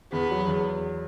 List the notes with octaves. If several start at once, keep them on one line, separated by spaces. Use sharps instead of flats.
E2 B3
F#3
E2